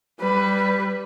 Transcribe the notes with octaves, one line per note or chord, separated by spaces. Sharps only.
G3 B4